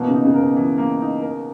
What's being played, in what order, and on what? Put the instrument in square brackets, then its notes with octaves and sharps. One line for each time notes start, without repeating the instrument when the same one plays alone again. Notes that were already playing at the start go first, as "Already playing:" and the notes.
Already playing: [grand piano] B2 [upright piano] E3 A#3
[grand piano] C#3
[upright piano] D#4
[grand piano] C#3
[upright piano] A#4
[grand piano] B2
[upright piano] E3
A#3
D#4
A#4